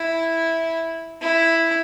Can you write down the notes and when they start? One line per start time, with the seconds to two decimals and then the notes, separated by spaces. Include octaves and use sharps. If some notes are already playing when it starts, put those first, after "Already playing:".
Already playing: E4
1.21 E4